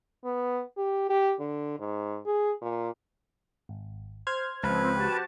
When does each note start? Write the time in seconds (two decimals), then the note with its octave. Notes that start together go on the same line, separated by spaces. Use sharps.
0.25 B3
0.77 G4
1.10 G4
1.40 D3
1.79 G#2
2.26 G#4
2.62 A#2
3.69 G#1
4.27 C5 F6 G#6
4.63 C#2 F3 C4 B4
4.94 F#4 G4 A5